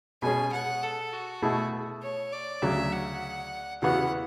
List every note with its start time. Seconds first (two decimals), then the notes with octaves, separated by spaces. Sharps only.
0.22 B2 G#3 C#4 G#4 G#5
0.53 F#5
0.83 A4
1.13 F#4
1.42 B2 A3 E4 G#4
2.02 C#5
2.33 D5
2.62 D2 C#3 F#3 E5
2.92 F#5
3.82 E2 C#3 E3 B3 F#4 F#5